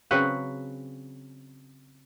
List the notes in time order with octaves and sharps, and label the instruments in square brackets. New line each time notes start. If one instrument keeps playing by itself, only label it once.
[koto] C#3 F#3 C4 F#4 B4